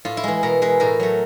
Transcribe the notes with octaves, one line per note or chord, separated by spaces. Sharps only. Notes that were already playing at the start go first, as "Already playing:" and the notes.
A2 F4
E4
E3 G#3
B2 A#4
G#3 B4
A2 A#4
F#3 A3